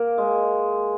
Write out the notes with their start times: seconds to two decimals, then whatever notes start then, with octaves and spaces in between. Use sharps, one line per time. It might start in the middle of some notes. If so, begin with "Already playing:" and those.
Already playing: A#3
0.18 G#3